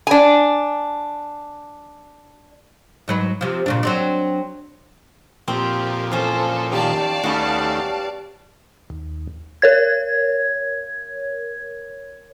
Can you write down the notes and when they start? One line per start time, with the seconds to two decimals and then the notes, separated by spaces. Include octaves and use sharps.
0.07 D4 G#5
3.08 G#2 F#3 B4
3.41 C3 F3
3.66 A#2 C#3 D4
3.83 F#3 C4 D4
5.48 F2 A#2 C4 G4
6.11 E3 C#4 F4 A4 C5
6.72 D#2 D#3 G4 D5 F5 A5
7.23 D#2 G3 A3 B3 C#4 F#4
8.90 D#2
9.62 A#4 C#5 G#6